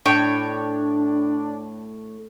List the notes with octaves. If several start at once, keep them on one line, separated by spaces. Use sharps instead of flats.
A2 D4 C#5 G5